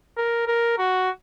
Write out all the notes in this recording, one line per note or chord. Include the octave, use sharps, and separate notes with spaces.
A#4
A#4
F#4